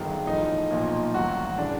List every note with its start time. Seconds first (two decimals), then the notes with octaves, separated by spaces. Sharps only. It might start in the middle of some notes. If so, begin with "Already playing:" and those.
Already playing: G1 G2 D#3 F#3 G#4
0.26 A1 A2 F3 D#4
0.70 B1 A#2 F3
1.14 A1 G2 D#3 F#3 F#4
1.58 C#3 E3 D4